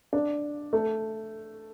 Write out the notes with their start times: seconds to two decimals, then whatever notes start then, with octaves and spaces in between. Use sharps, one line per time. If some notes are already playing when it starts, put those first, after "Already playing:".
0.13 D4
0.73 A3